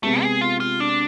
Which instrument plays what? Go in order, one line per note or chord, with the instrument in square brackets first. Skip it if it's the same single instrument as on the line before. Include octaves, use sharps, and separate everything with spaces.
[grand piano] C3 G#3 B3 [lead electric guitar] A3
[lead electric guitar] G#4
F4
F4
D4